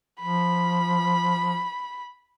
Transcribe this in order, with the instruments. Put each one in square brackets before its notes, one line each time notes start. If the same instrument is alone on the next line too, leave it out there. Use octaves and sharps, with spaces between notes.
[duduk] F3 [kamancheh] B5